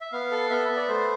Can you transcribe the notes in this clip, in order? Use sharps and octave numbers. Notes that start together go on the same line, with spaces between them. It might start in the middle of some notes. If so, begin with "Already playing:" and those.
E5
B3 F5
A4
B3 E5
B3
D5
A3 C5